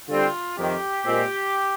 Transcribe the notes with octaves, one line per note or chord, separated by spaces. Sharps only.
D3 G3 C4 F4
F2 C3 D#3 G4
A#2 G#3 C4